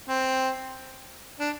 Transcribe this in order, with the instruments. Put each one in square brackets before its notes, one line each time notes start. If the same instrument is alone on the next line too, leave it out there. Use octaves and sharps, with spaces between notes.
[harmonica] C4
D4